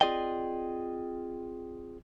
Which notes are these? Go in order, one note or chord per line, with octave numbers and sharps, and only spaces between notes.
C4 F4 G#4 D5 D#5 G5